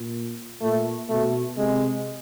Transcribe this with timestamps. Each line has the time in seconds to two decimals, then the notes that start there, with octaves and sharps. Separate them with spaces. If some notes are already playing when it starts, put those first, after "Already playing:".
Already playing: A#2
0.62 A#2 A3
1.09 B2 A3
1.57 C3 G#3